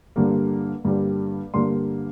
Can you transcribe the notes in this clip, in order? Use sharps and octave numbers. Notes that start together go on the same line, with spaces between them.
G2 D3 G3 A#3
G2 D3 G3 A#3
G2 D3 G3 A#3 C6